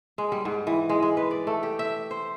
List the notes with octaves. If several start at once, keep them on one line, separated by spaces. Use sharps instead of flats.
G#3
G3
G#2
E3
G#3
G#3
B4
D5
A3
G4
E5
C5